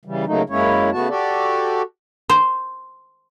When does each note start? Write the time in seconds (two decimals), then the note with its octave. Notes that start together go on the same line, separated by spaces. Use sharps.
0.05 C#3 E3 G3
0.26 C#3 F#3 A3 A#3 D#4
0.50 F#2 G#3 A#3 C#4 E4 C#5
0.92 C#3 A3 B3 F#4 A5
1.09 F#4 G4 A4 D5
2.29 C5